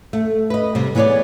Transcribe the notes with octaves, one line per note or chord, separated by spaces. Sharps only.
A3
B4 D#5
C3 G3
E3 B3 G#4 A#4 C#5 D5